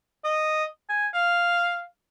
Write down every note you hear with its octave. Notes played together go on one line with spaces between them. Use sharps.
D#5
G#5
F5